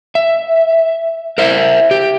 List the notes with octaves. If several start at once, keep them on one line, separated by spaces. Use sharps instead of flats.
E5
A#4 C5 E5
G4